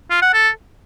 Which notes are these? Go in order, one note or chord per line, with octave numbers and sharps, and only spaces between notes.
F4
F#5
A4